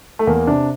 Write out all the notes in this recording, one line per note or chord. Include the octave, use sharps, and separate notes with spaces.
A3
E2 A#3
C3 D4